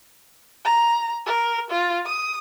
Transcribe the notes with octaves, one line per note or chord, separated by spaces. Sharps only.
A#5
A#4
F4
D#6